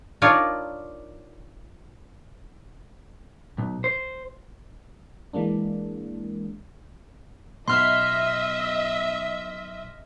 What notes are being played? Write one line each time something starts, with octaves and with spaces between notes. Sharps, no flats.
D4 D#4 F4 A#4 C#5 D5
B1
C5
E3 G#3 A#3 D4
B1 B2 D#5 E5 C6 F6